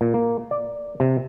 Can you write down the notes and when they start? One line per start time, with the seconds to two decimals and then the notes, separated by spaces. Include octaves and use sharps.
0.01 A#2
0.14 A#3
0.51 D5
1.00 C3